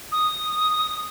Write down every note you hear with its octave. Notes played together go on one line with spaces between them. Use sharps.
D#6